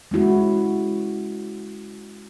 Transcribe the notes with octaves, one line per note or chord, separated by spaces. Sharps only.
G#3 C#4 E4 F#4